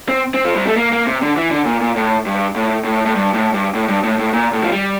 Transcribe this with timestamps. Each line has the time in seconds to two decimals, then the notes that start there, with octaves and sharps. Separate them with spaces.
0.09 C4
0.34 C4
0.45 F3
0.56 G3
0.67 A3
0.77 A#3
0.93 A#3
1.07 C3
1.22 D3
1.37 E3
1.51 D3
1.66 A#2
1.81 A#2
1.96 A2
2.26 G2
2.56 A2
2.84 A2
3.06 A2
3.15 G2
3.34 A2
3.54 G2
3.75 A2
3.88 G2
4.03 A2
4.19 A2
4.33 A#2
4.53 A2
4.63 F3
4.72 G3